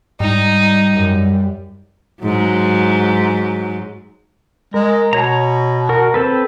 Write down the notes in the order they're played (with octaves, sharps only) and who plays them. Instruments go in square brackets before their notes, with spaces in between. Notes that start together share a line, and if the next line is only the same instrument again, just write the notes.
[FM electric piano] G#2 [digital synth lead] G3 [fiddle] D#4
[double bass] F#2
[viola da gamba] G#2 F#3
[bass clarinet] G#3 [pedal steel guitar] A#4
[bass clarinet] B2 [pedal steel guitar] C#5 A#5
[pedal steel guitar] F#4 A#4
C4 A4 B4